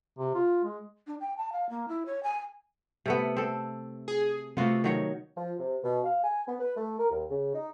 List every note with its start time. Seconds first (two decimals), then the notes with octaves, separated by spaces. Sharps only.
0.18 C3
0.35 F4
0.64 G#3
1.07 D4
1.20 G5
1.37 A5
1.52 F5
1.69 A#3
1.88 E4
2.06 C#5
2.23 G#5
3.06 C3 A3 B3
3.37 C4 A4
4.08 G#4
4.57 C3 A3 B3 F4 F#4
4.84 D#3 F#3 C#5
5.36 F3
5.59 C3
5.83 B2
6.04 F5
6.24 G#5
6.47 B3
6.60 B4
6.77 A3
6.99 A#4
7.10 D#2
7.30 C#3
7.54 D#4